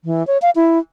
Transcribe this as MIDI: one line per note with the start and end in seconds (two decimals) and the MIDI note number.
0.05 0.25 52
0.27 0.38 73
0.42 0.50 77
0.56 0.78 64